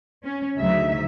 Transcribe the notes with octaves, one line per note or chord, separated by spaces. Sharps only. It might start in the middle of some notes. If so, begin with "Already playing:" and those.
C#4
D2 C#3 F#3 D#4 E5